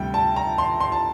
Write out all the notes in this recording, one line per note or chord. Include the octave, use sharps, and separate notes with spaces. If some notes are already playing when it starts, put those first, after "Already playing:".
Already playing: D2 C3 G3 G5
A5
A#5
C6
C6
A5